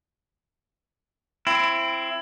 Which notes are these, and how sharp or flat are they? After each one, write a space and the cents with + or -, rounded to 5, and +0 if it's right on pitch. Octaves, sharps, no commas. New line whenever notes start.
C4 +0 E4 +20